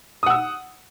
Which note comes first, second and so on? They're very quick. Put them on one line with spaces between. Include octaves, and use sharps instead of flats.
D#6 F#5 E6